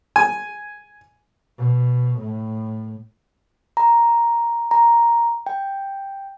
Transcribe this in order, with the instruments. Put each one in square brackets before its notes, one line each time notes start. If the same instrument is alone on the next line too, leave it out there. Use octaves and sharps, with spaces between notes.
[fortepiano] G#5
[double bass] B2
A2
[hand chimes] A#5
A#5
G5